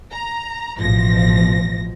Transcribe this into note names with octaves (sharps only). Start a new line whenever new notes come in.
A#5
A1 B2 F3 A#6